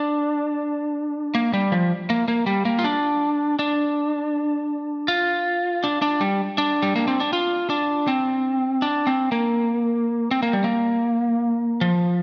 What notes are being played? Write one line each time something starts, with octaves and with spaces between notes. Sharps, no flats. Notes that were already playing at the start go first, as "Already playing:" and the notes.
Already playing: D4
A#3
G3
F3
A#3
A#3
G3
A#3
F4
D4
D4
F4
D4
D4
G3
D4
G3
A#3
C4
D4
F4
D4
C4
D4
C4
A#3
C4
A#3
G3
A#3
F3